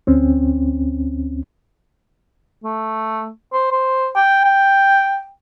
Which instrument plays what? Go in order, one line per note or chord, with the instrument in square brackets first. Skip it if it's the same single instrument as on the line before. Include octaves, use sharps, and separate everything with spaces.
[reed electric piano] D2 C4 C#4
[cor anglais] A3
C5
C5
G5
G5